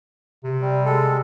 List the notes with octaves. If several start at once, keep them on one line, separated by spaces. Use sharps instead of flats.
C3
G3
G#3 A4